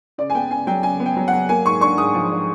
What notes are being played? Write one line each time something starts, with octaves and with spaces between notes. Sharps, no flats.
C#3 D5
G#5
B3 G5
C#3 G#5
F#3 G5
C#3 G#5
B3
G5
F#3
F#5
F#3
A#3 G#5
G#2 C#6
D4 C#6
G#2 D#6
F3
D4